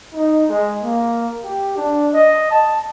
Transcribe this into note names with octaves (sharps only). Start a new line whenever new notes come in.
D#4
G#3
A#3
G4
D4
D#5
A5